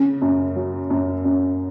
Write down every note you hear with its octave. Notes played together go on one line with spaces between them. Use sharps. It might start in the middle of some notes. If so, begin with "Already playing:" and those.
Already playing: C#3
F#2
F#3
F#2
F#2